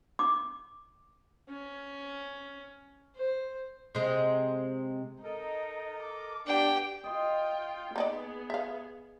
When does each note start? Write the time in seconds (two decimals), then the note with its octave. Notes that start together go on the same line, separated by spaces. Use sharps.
0.19 D6
1.49 C#4
3.16 C5
3.95 C3 G#3
5.24 D#4 A4 A#4 D#5
6.02 D6
6.47 B3 D4 G4 B4 G5 D6
7.04 F4 D#5 G5 C6
7.96 A#3 B3 D#4 G#4 D5
8.50 E5 F5